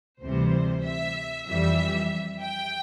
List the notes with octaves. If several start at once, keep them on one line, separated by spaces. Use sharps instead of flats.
D2 C3 E3 G3 C5
E5
F2 E3 G3 E5
G5